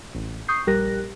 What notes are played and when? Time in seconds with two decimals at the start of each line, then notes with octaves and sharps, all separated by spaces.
0.15 A1
0.48 C#6 D#6 G6 C7
0.67 A#1 G3 G4 A#4 F#6 A#6